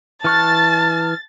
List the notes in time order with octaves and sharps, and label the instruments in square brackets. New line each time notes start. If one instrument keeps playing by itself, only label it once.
[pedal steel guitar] E3 C#6 F#6 [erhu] A5 [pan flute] F6 [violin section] A6